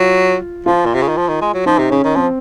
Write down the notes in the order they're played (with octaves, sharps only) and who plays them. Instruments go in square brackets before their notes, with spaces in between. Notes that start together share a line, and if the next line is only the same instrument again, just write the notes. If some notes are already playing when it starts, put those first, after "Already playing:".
Already playing: [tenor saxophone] F#3 [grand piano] F4
[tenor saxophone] F3 [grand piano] F4
[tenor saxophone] A#2
C3
C#3
D#3
F3
D#3
G#3
F#3
[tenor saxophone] F3 [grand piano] D#4
[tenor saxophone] C3
[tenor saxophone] C#3 [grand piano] C#4
[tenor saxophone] D#3
[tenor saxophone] F3 [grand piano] C4